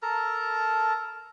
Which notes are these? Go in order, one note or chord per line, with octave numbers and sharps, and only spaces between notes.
A4 A#4 A5 A#5